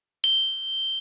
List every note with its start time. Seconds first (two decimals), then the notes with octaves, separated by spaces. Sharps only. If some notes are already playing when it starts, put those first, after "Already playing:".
0.24 G7